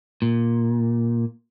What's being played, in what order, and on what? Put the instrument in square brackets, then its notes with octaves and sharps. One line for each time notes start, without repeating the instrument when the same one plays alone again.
[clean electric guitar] A#2